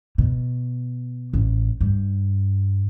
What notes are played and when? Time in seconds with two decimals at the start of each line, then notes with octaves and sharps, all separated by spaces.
0.18 B2
1.33 A1
1.81 G2